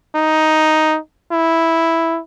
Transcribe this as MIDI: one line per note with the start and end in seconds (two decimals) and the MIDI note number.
0.15 0.97 63
1.32 2.19 64